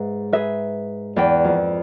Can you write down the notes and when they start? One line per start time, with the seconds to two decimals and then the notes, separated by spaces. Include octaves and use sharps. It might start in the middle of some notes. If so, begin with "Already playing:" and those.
Already playing: G#2 B4 E5
0.33 G#4 B4 E5
1.16 E2 B4 D5 G5
1.44 F2